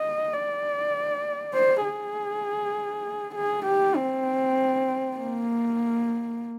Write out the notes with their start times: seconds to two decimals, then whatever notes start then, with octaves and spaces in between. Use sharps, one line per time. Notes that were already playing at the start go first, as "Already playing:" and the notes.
Already playing: D#5
0.33 D5
1.54 C5
1.84 G#4
3.35 G#4
3.66 G4
3.96 C4
5.17 A#3